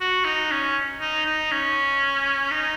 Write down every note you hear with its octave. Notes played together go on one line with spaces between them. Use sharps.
F#4
D#4
C#4
D#4
D#4
C#4
D#4